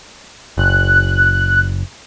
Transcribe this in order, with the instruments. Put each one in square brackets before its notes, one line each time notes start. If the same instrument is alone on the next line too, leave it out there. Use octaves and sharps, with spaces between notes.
[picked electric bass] F#1 [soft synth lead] F#6